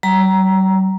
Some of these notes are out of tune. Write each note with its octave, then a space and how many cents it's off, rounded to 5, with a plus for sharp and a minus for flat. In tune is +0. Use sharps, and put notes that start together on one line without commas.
G3 -45 A#5 +10